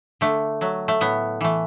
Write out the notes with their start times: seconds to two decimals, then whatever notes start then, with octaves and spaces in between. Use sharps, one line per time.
0.21 D3 A3
0.61 F#3 A3
0.88 A3
1.01 A2 B3
1.41 E3 A3